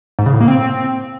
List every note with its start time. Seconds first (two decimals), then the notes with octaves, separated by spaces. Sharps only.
0.19 G#2
0.26 C#3
0.33 A2
0.41 A#3
0.48 C4